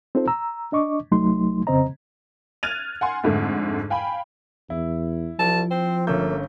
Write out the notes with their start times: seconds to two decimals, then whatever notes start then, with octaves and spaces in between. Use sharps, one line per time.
0.15 C4 D#4 F4 A4 C5
0.28 A#5 E6
0.72 D4 D#5 C#6 D6
1.12 C2 F#3 A3 D#4 C6
1.67 F2 C#3 C4 C5 D#5 A#5
2.63 F6 F#6 G#6 A6 D#7 F7
3.01 F#5 G#5 C6
3.24 F2 G#2 D3 A3
3.90 F5 G5 G#5 B5
4.70 E2 E4
5.39 C2 F3 A5
5.71 C4 C5
6.07 G1 A3 A#3 C#4 G6